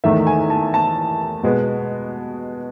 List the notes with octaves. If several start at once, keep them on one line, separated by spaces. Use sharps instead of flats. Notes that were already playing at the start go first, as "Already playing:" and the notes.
E2 D#3 A3 E5
G#5
A5
A5
B2 G#3 B3